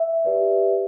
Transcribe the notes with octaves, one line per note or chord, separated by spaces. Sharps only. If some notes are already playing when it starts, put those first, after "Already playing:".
Already playing: E5
G4 B4 D5